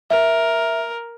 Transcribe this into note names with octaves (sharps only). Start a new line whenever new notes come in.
A#4 E5